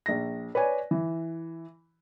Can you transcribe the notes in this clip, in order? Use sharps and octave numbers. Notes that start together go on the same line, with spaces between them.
A#1 A#6
B4 C#5 D5 G#5
E3